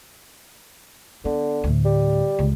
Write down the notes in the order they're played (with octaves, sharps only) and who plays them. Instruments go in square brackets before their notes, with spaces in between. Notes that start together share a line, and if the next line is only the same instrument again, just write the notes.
[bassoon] D3 [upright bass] B3
[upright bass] D2 A2
[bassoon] G3
[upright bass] C#2